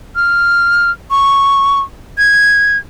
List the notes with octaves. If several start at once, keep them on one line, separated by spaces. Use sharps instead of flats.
F6
C#6
G#6